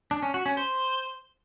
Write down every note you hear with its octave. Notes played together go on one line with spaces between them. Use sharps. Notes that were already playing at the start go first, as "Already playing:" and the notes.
D4
C#4
F#4
C#4
C5